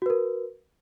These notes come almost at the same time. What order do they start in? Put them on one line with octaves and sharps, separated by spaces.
F#4 B4 A#4